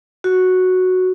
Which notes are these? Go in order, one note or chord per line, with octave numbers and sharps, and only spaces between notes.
F#4